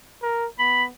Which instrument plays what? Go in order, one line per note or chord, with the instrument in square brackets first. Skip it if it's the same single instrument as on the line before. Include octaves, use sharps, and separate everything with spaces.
[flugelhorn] A#4
[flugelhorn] B3 [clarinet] B5